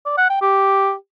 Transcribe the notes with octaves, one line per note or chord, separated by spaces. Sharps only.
D5
F#5
G5
G4